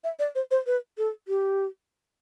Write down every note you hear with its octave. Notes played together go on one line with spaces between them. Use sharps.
E5
D5
C5
C5
B4
A4
G4